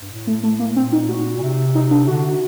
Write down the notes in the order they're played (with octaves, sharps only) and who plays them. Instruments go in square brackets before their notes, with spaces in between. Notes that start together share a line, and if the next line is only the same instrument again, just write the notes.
[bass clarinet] G2
A2
[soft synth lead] A3
A3
A#3
[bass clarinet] A#2 [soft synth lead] C4
[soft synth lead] D#4
F#4
[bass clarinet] A#2
C3
[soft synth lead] D#4
D4
[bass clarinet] D3 [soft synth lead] F#4